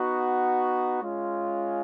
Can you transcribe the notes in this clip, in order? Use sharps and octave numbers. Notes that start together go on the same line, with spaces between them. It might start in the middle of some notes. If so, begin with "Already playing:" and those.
Already playing: B3 D#4 F#4
G#3 C#4 F4